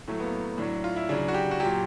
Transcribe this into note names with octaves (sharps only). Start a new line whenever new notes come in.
A2 F#3 A3
B3
A#3
A2 F#3 D4
F4
E4
C#3 F#3 D4
F#4
G4
F#4
A#2 F#3 G4